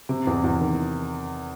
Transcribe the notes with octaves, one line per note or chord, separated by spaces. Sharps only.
C3
E2
E2
D#3